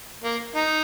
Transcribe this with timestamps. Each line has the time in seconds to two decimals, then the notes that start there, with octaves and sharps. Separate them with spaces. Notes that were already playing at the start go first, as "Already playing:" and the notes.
0.24 A#3
0.56 D#4